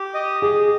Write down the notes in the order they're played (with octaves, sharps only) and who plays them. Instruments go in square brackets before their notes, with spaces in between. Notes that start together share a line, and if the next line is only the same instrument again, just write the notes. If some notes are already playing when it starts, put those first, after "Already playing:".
Already playing: [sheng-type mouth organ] G4
D#5
[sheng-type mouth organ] G4 [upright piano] G#4